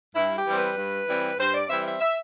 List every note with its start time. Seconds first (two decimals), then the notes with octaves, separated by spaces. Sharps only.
0.15 G2 E4
0.35 G4
0.46 E3 G3 C4
0.56 B4
0.77 G2
1.08 E3 G3 C4
1.38 G2 C5
1.54 D5
1.69 E3 G3 C4 E5
1.85 E5
2.00 E5